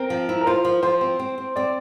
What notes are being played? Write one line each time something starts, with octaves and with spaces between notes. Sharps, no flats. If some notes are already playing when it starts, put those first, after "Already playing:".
Already playing: C4 A#4
F3
E4
A#4
F4 C5
F3
F3 C5
C4
C4
C4
C4 D5